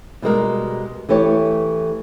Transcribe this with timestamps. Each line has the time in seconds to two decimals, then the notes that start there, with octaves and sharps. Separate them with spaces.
0.22 B2 G3 G#3 A#4
1.09 E3 A3 G4 C#5